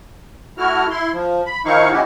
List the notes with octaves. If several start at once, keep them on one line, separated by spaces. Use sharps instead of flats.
A3 E4 F#4 F6
E4 C6
F3
B5
D#3 F3 D#4 E4 F5 C#6
G#3 C#4 E4 F#4 G4